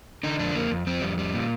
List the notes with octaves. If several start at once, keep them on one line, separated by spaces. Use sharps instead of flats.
D3 D#4
F2 D4
F2 A#3
F2
F2 C4
F2 G3
G3
A#2